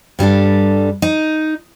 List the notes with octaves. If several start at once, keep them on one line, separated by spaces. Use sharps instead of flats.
G2 G3 D4 A4
D#4